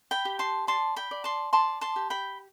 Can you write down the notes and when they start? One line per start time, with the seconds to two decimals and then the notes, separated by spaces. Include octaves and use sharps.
0.11 G5 B5
0.25 G4
0.39 A5 C6
0.67 D5 A5 C6
0.96 G5 B5
1.11 D5
1.24 A5 C6
1.53 D5 A5 C6
1.81 A5 C6
1.96 G4
2.10 G5 B5